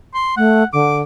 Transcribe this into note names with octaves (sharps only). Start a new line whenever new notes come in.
C6
A3 F#5
D3 D6